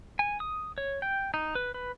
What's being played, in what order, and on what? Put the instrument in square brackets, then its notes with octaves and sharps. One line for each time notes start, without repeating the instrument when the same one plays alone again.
[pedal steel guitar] G#5
D#6
C#5
G5
D#4
B4
B4